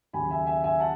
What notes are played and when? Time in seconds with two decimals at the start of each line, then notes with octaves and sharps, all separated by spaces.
0.13 D#2 C#3 F#3 G#5 B5
0.30 E5 G#5
0.47 E5 G#5
0.64 E5 G#5
0.80 F#5 A5